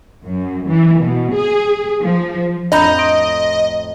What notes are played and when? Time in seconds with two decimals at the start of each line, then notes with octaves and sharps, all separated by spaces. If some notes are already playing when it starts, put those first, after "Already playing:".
0.24 F#2
0.68 E3
1.01 B2
1.34 G#4
2.02 F3
2.72 F2 A2 D4 D#5 A#5 B5 G6
2.98 C6 D#6 D7